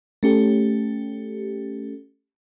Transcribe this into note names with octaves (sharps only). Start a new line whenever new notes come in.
A3 C#4 G4 A4